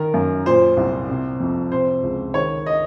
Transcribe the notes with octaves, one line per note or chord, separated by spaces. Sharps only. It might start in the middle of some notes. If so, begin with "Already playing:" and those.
Already playing: D#3 A#4
F#2
A#2 C5
C2
C3
F2
C3 C5
C#2
D#3 C#5
D#5